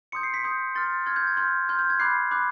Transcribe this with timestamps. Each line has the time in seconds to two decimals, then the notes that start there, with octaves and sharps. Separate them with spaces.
0.12 C6 D#6 G6 C#7
0.23 C7
0.34 B6
0.43 C6 D#6 G6
0.75 C6 F6 A6
1.06 C6 F6 G#6
1.16 G6
1.27 G#6
1.37 C6 F6 G6
1.69 C6 F6 G6
1.79 G6
1.90 G#6
2.00 B5 D6 F#6 C7
2.31 B5 D6 F#6